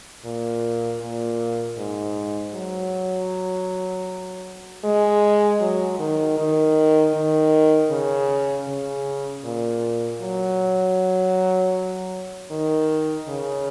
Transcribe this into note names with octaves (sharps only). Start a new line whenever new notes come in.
A#2
A#2
G#2
F#3
G#3
F#3
D#3
D#3
D#3
C#3
C#3
A#2
F#3
D#3
C#3